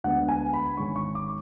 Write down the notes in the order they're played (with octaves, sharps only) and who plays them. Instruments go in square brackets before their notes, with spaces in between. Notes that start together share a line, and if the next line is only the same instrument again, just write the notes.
[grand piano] D2 D3 G#3 B3 F#5
G#5
B5
G#1 G#2 G#3 C#4 C#6
C#6
D6